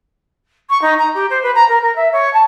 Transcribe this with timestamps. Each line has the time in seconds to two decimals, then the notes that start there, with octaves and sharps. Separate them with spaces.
0.70 C#6
0.82 D#4
0.99 A#5
1.14 G4
1.30 C5
1.43 B4
1.55 A#5
1.69 A#4
1.82 A#4
1.96 E5
2.13 C#5
2.33 A5